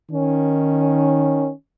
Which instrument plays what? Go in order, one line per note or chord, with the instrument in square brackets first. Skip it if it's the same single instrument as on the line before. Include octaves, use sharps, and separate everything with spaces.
[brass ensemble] D#3 C#4